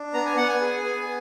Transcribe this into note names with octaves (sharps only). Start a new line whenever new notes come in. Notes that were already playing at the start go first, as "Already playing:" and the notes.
Already playing: D4
B3 A#5
G#5
B3 F#5
G#5
G#4
B3